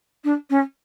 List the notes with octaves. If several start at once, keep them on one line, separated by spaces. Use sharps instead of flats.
D4
C#4